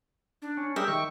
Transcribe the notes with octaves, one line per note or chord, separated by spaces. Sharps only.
D4
C#4
G3 G4 G#4 A#4 E5
D#3 G5 C#6